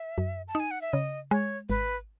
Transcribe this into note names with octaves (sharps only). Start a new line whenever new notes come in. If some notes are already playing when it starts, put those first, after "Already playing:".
Already playing: E5
F#2
A5
D#4 G#5
F#5
E5
C#3 D#5
G#3 C#5
G#1 B4